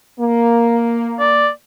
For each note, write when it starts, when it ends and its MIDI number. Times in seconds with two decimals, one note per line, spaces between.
0.19 1.51 58
1.20 1.49 74